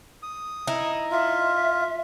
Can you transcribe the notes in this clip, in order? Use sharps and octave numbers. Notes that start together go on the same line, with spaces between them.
D#6
D#4 E4
F4 E5